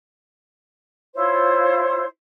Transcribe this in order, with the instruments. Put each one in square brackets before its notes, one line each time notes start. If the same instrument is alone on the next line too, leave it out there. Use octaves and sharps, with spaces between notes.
[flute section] E4 F4 C5 C#5